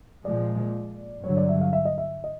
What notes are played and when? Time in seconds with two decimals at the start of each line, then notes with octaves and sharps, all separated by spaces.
0.25 A#2 F3 G#3 D5
1.24 G2 D3 F#3 C#5
1.37 D5
1.49 E5
1.61 F5
1.73 E5
1.85 D#5
1.98 E5
2.24 D#5